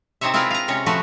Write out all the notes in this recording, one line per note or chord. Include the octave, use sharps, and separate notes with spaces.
C3 C4 D#4 C5 C#5 E5
C4 E4 F4 G#4 A#4 B4
F5 A#5
C3 G#3 C#4 C#5
F3 A3 F#4 B4